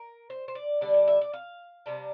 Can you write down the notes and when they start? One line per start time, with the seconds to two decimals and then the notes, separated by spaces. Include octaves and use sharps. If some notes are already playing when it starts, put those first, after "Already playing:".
Already playing: A#4
0.30 C5
0.48 C5
0.55 D5
0.81 D3 G3 D4 D5
0.94 D5
1.08 E5
1.21 D5
1.33 F5
1.86 C3 G3 D4